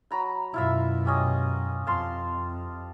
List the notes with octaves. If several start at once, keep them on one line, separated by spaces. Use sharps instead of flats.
F#3 A#5 B5
F#2 B2 E4 F4 E5
G3 C#4 D#5
F2 F5 A5 C6